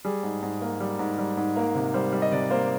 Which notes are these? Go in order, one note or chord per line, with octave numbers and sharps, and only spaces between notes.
G3 G#4
G#2
G#2
A#3
G3
G#2
G3
G#2
A#3 A#4
C3
G3 C5
G3
D#5
C3 D5
A#3 C5